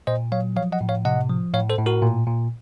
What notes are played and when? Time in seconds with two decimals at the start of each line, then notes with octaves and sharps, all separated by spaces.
0.07 A#2 C5 D#5
0.32 F#3 C#5 F5
0.56 F3 C#5 F5
0.72 D#5 F#5
0.81 A2
0.89 C#5 F5
1.05 C3 D#5 F#5
1.29 F3
1.54 A2 C#5 F5
1.70 A4 C5
1.78 A2
1.86 F#4 A#4
2.02 A#2
2.27 A#2